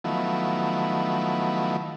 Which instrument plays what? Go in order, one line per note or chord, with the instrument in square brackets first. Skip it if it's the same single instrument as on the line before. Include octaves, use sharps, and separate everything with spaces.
[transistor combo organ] D#3 F3 F#3 A3 B3 E4